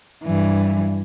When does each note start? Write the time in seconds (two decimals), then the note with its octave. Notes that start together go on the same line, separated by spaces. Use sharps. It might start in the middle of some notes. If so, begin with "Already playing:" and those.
0.23 G2 E3